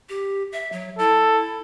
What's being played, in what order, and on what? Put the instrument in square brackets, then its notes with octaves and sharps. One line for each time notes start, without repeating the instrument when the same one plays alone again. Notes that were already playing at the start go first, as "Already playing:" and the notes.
[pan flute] G4
E5
F#3
[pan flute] E4 [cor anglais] A4